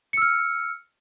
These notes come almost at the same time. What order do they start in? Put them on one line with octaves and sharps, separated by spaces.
C#7 E6 F6